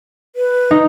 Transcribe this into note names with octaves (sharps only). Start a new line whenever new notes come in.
B4
D#4